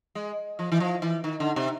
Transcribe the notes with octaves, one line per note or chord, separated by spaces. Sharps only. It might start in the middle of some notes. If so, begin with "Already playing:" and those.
G#3
F3
E3
F3
E3
D#3
D3
C3